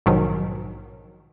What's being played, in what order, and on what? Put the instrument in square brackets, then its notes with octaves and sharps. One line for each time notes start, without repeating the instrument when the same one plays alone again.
[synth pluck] A#1 G#2 B2 D#3 F#3